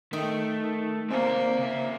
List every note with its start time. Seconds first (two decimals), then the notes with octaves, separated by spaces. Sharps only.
0.13 D#3 A3
1.10 A#3 C4 C5 D5
1.59 C#3 E5